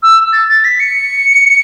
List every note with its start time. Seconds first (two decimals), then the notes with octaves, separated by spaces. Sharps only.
0.03 E6
0.33 A6
0.49 A6
0.65 B6
0.80 C#7